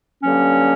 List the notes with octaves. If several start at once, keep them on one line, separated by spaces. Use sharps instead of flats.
G2 D3 F#3 A#3 C#4